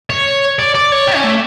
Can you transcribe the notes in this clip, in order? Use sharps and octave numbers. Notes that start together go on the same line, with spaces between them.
C#5
D5
D5
C#5
G4
C#4
A3